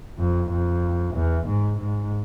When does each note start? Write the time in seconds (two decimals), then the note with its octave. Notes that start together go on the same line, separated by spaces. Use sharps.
0.19 F2
0.51 F2
1.15 E2
1.47 G#2
1.79 G#2